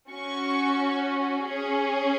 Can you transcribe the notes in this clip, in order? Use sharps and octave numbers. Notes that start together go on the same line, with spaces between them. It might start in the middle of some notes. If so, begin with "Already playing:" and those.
C#4 F#4 C#6
C#4 G#4